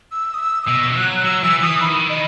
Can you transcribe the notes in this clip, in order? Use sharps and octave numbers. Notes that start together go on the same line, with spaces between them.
E6
D#6
E6
D#6
B2 E6
E6
F#3 F#6
F#3 E6
E3 E6
E3 D#6
D#3 B5
D#5